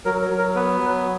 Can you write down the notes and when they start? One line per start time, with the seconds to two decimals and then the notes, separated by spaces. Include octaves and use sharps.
0.05 F#3 A#4
0.22 A#4
0.30 F#3
0.38 A#4
0.55 B3 B4
0.80 F#3